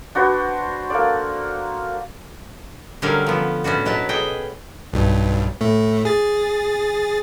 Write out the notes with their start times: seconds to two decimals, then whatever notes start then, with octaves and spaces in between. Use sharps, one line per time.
0.15 D4 F#4 B4 C5
0.90 A#3 A4 D5
3.02 D3 F#3 G3 C#4 A#4 F5
3.26 F3 B3 A4
3.64 A2 B3 C#4 D4 F#4
3.85 B2 F#3 E4 B4 A5
4.09 G#4 A4 D#5 G5
4.94 B1 G2
5.61 A2 A3
6.05 G#4 A6